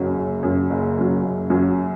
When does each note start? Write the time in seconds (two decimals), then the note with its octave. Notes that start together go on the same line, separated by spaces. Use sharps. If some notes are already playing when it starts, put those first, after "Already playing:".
Already playing: F#1 F#2 F#3
0.16 F#1
0.43 F#2 F#3
0.70 F#1
0.97 F#2 F#3
1.23 F#1
1.50 F#2 F#3